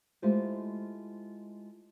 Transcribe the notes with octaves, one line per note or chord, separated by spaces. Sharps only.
G#3 A3 E4 F4 G4 C5